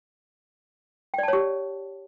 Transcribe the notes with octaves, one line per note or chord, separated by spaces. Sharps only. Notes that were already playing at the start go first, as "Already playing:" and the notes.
G4 C#5 D5 G5 A5